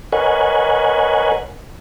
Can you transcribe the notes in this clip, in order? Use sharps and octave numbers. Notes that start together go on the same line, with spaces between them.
A#4 B4 C#5 D#5 F#5 G#5